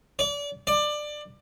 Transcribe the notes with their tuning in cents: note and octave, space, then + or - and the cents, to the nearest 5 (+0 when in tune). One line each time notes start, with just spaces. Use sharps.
D5 -30
D5 +20